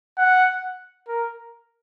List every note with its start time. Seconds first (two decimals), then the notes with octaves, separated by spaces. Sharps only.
0.18 F#5
1.08 A#4